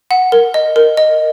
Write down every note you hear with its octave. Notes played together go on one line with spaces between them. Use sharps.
F#5
A#4
D#5
A#4
D#5